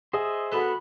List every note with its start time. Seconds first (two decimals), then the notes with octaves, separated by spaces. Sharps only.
0.13 G#4 C5 D#5 E5
0.52 B3 F#4 A4 B4 B5